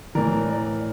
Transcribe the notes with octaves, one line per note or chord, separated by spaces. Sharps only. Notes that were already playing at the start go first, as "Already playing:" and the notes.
A2 E3 A#4 D5
A#4 D5